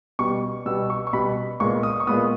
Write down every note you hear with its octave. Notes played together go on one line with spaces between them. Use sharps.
B2 G3 B3 C#6
B2 G3 B3 E6
C#6
C#6
B2 G3 B3 B5
A#2 G#3 B3 C#6
D#6
C#6
A#2 G#3 B3 D#6